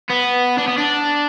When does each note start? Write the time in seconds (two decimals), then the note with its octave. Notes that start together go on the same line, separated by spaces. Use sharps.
0.10 B3
0.58 D4
0.67 B3
0.77 D4